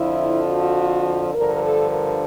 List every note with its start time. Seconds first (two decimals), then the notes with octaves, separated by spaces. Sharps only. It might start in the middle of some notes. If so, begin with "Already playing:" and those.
Already playing: F2 D3 F3 E4
0.51 F#4
1.34 G2 D3 F3 A#4
1.63 A4
1.91 A#4